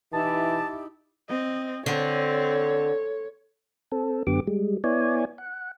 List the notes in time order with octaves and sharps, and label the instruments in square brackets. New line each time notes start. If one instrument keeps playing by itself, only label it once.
[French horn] E3 [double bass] D#4 E4 [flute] G4 [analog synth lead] A5
[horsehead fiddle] C4 [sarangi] D#5
[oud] D3 [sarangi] C4 [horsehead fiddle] C#5
[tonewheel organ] C4 A4
F#2 D3 B3 G4 D6
G3 G#3
B3 E4 C#5 D5 G#5
F#5